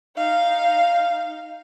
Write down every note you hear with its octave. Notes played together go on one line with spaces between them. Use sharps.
D#4 F5